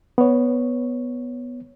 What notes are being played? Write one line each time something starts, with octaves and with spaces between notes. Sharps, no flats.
B3 C#5